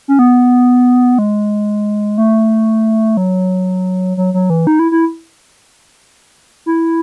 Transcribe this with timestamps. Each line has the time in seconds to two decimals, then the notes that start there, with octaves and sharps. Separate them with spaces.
0.08 C#4
0.19 B3
1.19 G#3
2.18 A3
3.17 F#3
4.17 F#3
4.34 F#3
4.50 E3
4.67 D#4
4.79 E4
4.92 E4
6.66 E4